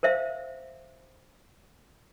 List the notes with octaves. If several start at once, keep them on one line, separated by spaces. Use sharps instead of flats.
A#4 C5 E5 F5